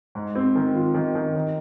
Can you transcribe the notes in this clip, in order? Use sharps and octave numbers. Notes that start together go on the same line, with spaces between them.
G#2
C4
D#3
F4
D#3
D#3
D#3